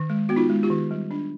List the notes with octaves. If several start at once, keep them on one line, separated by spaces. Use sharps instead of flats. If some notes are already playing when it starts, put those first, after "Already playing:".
Already playing: D#3
G#3
B3 F#4
D#4 F4
G#3
F4 G4
D#3
G3
D4